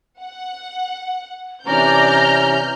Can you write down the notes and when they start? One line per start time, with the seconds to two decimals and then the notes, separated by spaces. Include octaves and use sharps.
0.21 F#5
1.66 C3 E3 C#4 D4 D5 A#5 F6 G6